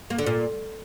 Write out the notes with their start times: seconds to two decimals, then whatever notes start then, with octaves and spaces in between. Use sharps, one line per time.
0.10 A#3
0.18 D3
0.27 A#2